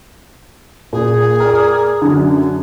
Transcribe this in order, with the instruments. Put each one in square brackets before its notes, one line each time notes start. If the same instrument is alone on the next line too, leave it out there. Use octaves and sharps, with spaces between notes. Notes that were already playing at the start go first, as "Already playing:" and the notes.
[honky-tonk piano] A#2 [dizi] G#4
[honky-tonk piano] A#4 D5
F#2 D3